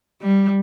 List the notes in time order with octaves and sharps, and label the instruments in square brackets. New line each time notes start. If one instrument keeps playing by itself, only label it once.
[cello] G3